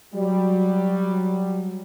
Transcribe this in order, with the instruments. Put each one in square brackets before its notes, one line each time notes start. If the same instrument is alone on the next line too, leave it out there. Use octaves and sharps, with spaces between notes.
[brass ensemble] F#3 G3